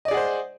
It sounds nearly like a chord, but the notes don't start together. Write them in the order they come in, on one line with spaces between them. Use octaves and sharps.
D#5 D5 G#4 F#5 C5